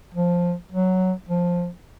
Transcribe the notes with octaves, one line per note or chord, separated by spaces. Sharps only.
F3
F#3
F3